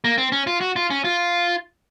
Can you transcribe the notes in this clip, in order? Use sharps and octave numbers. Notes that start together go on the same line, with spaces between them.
A#3
C4
C#4
F4
F#4
F4
C#4
F4